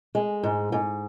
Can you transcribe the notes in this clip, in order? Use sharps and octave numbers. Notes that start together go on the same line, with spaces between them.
G#3
G#2
G#2